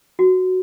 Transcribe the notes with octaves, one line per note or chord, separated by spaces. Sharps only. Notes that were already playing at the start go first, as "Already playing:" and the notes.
F#4